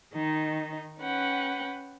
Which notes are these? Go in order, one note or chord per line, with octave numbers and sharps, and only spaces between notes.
D#3 D#4
C#4 B4 F#5 G5